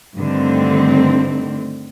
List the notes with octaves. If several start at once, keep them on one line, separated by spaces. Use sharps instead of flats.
G2 D3 D#3 A3 C4